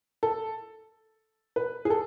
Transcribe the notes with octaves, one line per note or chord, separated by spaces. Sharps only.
A4
B4
G#4
A4